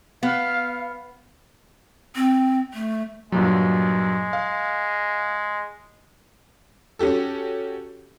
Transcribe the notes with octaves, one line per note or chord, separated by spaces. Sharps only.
B3 F5
C4
A3
G2 A#2 F#3 G#3
F5
C#4 F#4 G4 A4